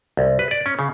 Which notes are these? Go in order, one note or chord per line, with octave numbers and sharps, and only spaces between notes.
C2
B4
D5
C#4
C#3